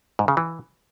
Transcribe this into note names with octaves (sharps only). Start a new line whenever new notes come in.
G#2
C#3
E3